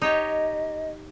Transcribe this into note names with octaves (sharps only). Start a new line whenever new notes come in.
D#4 G4 C#5 D#5